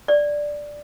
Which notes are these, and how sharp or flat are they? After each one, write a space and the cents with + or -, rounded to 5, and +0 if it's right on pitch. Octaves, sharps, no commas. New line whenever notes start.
D5 +0